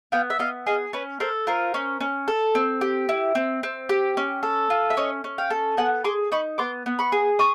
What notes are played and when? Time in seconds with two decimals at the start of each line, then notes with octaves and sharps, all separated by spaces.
0.12 B3 F5 G5
0.30 E5
0.39 B3 D#5 F5
0.66 G#4 D#5 F5
0.93 C#4 B4 C#5
1.20 A4 A#4 C5
1.47 F4 A#4 C5
1.74 C#4
2.01 C#4
2.28 A4
2.55 C4
2.81 G4
3.09 E4
3.35 C4
3.63 C4
3.89 G4
4.17 C#4
4.43 A4
4.70 F4
4.90 E5
4.97 C#4 C#5 D#5
5.24 C#4
5.38 F5 G5
5.50 A4
5.77 B3 F#5 G#5
6.04 G#4 C6 D6
6.32 D#4 B5 C#6
6.58 B3 C6 D6
6.86 B3
6.99 B5 C#6
7.12 G#4
7.39 C#6 D#6